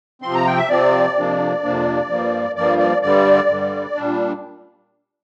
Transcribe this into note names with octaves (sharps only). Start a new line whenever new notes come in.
C3 F3 C4 C6
A#5
G5
E5
C3 F3 C4 D5
F2 C3 F3 A#3 D4
F2 C3 F3 A#3 D4
G2 F3 A#3
G2 F3 A#3 D5
D5
G2 D3 G3 D5
G2 D3 G3
A#2 G3 D4